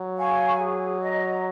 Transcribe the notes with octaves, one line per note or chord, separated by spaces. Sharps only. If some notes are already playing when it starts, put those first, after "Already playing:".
Already playing: F#3
F5 G#5 C#6
G#4
D#5 A#5